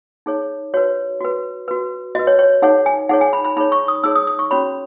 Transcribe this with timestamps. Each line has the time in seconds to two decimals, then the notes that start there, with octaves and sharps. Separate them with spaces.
0.26 D#4 G#4 C#5
0.74 F#4 B4 C#5
1.21 F#4 B4
1.68 F#4 B4
2.15 F#4 D#5
2.19 B4
2.27 C#5
2.39 C#5
2.62 D#4 G#4 C#5 F#5
2.86 G#5
3.09 D#4 G#4 C#5 F#5
3.21 G#5
3.33 B5
3.45 B5
3.57 D#4 G#4 C#5 B5
3.72 C#6
3.88 D#6
4.04 D#4 G#4 C#5 E6
4.15 D#6
4.27 D#6
4.39 C#6
4.51 C#4 F#4 C#5 B5